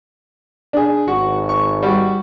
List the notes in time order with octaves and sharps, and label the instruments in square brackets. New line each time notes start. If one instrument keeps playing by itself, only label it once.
[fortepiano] D4 G#4
[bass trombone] G#1 [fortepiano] F#4
[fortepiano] C#6
G3 F#4